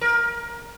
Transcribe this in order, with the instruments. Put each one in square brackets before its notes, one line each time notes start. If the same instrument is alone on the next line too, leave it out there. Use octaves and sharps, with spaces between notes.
[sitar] A#4